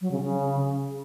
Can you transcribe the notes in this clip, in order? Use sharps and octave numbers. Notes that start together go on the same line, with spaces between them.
F#3
C#3
C#3